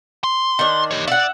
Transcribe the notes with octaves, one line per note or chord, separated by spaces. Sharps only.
C6
D#3 D4
G4 C#5
D5 E5 F#5